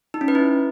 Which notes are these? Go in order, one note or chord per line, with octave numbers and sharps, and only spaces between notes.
D#4
C#4
B4
E4